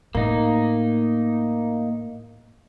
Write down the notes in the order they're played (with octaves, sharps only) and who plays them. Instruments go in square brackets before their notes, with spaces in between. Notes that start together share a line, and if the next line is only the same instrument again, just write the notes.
[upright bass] A2 [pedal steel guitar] A#3 D#4